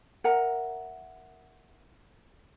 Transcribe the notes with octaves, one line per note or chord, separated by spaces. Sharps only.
A#4 E5 F#5 A#5